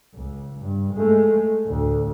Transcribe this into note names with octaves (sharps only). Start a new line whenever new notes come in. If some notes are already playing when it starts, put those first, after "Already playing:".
C#2
G2
G#3 A3
D2 A2